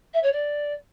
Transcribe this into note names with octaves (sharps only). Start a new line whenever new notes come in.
E5
C#5
D5